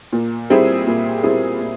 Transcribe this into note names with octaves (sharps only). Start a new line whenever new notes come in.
A#2
G3 C4 E4 G#4
A#2
G3 C4 E4 G#4
A#2